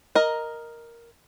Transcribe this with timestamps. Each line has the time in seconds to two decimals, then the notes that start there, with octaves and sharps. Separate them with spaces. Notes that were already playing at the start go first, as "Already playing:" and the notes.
0.15 A#4 D#5